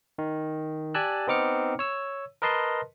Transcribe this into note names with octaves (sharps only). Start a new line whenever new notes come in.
D#3
G4 D5 G#5 A5 E6 F#6
B3 C4 D#4 D6 F6 C#7
C#5 E6
A#4 B4 D#5 A5 C6